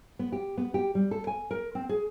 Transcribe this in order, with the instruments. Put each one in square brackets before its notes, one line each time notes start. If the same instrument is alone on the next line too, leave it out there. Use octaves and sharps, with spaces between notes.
[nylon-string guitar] B3
G4
B3
G4
G3
A4
G#5
A#4
C4
G#4